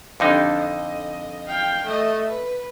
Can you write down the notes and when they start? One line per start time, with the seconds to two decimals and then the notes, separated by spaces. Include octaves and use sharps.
0.20 F2 D3 D4 D#4 G4
0.56 D#5
1.48 F5 G5
1.85 A3 D#5
2.29 B4